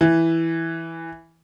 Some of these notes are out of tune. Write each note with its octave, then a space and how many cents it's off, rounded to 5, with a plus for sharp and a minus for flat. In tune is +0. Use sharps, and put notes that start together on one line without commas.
E3 +0 E5 +0